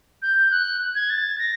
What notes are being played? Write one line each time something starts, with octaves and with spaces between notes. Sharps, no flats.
G6
F#6
G#6
A6
A#6